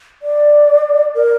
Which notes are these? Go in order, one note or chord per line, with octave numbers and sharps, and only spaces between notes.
D5
A#4